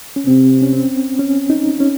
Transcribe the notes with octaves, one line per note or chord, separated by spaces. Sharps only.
C#4
C3 C4
C#4
C4
C#4
D#4
C#4